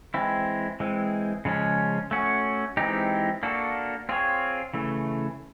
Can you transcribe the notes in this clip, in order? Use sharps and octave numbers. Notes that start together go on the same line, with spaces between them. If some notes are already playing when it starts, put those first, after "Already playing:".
E3 G#3 C4 E4
E3 G#3 C4
C#3 F3 G#3 C#4
A3 C#4 F#4
E3 G#3 C4 D#4 G4
A#3 D4 F#4 A4
C4 F4 G#4 C#5
C#3 E3 A3